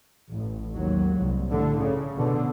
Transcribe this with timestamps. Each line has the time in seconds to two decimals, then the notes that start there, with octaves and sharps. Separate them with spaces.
0.31 A1
0.74 D#2 G#2 F#3
1.20 C2
1.50 A2 D3
1.79 C#3
2.17 B2 D3